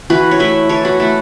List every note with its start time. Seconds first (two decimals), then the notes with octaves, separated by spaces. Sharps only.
0.10 E3 F#4 B4
0.31 C#5
0.39 A3 E4 B4 E5
0.69 E3 A4 C#5
0.85 F#4 B4
1.00 A3 E4 A4